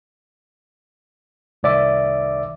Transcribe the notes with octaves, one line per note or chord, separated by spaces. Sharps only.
C2 D#3 D5 E5 D6